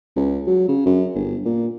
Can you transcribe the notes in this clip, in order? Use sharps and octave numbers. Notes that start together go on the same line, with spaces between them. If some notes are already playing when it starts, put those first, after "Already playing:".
C#2
F#3
C#3
F#2
G1
A#2